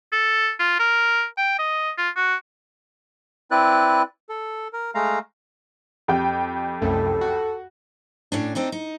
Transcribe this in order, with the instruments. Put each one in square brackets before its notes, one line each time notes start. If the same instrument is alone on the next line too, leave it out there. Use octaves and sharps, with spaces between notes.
[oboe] A4
F4
A#4
G5
D#5
F4
F#4
[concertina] C4 E4 B4 D5 F#6
A4
A#4
G#3 A3 F5 A#5
[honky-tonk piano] F2 G4 G5
[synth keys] C2 F#2 A3 [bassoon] A4
[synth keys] F#4
[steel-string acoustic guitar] A2 C#4 D4
C4 D4 D#4
D#4